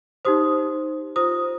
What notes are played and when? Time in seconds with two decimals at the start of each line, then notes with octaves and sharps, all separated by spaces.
0.25 D#4 G4 C5 D#6
1.16 F4 C5 D#6